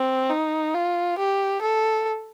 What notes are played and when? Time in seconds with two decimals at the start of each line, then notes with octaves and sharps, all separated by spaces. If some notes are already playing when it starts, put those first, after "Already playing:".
Already playing: C4
0.30 D#4
0.74 F4
1.18 G4
1.61 A4